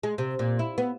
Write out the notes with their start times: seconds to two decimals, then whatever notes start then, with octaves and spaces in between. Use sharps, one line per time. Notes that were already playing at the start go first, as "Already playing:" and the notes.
0.03 G#3
0.18 C3
0.39 A#2
0.59 E4
0.78 B3